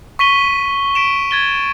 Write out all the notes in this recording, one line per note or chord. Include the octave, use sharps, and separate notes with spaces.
C#6 B6 D#7 G7
B6 D7 E7
G#6 A6 G7